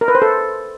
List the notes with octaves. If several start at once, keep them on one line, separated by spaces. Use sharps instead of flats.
A#4
B4
C5
A4